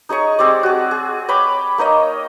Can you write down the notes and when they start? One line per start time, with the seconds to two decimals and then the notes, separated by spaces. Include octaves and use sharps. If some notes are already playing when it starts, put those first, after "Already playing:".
0.09 D#4 G#4 C#5 C#6
0.39 G#3 C4 G4 D5
0.63 F#4 G#4
0.91 G#4
1.29 C#5 G5 B5 D6
1.78 A#3 D#4 C#5 D#5